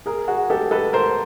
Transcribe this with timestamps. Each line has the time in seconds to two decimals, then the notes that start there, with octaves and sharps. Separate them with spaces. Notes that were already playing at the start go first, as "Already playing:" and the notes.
0.06 G#4 A#4
0.28 F#4 G#4
0.50 G4 A4
0.71 A4 B4
0.93 A#4 C5